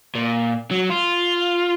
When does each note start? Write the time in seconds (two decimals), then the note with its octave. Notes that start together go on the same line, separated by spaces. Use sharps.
0.15 A#2
0.71 F#3
0.90 F4